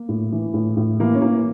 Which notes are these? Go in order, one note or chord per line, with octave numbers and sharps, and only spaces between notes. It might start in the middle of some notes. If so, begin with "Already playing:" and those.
Already playing: A#3
A2
E3
A2
A2
E3 A#3
C#4
E3 A#3